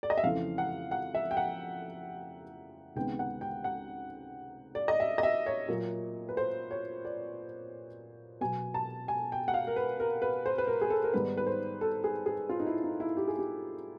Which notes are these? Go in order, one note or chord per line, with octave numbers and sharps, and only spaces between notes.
D5
D#5
E5
F2 C#3 E3 A3 C4 F5
F#5
F#5
E5
G5
F#5
C#2 C3 D#3 G#3 B3 G5
F#5
G5
F#5
D5
D#5
E5
D#5
E5
C#5
A#2 F#3 A#3
B4
C5
C#5
D5
B2 F#3 B3 G#5
A5
G#5
G5
F#5
F5
A#4
B4
A#4
B4
C5
B4
A#4
G#4
A4
A#4
G#2 D#3 G3 B3 B4
B4
C5
A4
G#4
G#4
F4
D#4
E4
D#4
E4
G4
G#4
G4